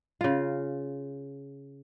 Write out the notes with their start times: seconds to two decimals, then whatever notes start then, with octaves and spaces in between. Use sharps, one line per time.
0.21 C#3 F4